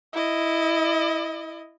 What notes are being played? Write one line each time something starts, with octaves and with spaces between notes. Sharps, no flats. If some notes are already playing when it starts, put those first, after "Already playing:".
E4 D#5